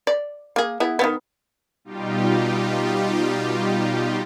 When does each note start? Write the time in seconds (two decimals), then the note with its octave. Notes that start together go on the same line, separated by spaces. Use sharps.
0.07 D5
0.56 A#3 G#4
0.80 B3 E4 G#4
0.99 D#3 E3 B3
1.84 B2 G3 D#4 F4 G4